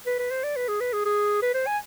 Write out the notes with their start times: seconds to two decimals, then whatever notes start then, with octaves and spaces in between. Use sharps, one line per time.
0.06 B4
0.19 B4
0.31 C5
0.44 D5
0.56 B4
0.68 G#4
0.80 B4
0.93 G#4
1.05 G#4
1.42 B4
1.54 C5
1.67 G#5